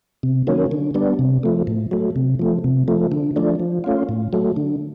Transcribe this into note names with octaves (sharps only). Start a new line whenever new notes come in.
C3
D#3 F#3 A#3 C#4
D3
G3 B3 D4
C3
F3 A3
A2
F#3 A3
C3
F3 A3
C3
F3 A3
D3
F3 A3 D4
F3
A3 C#4 F4
A2
F#3 A3
D3